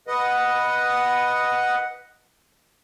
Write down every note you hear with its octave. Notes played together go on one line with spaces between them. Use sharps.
B4 D#5 F#5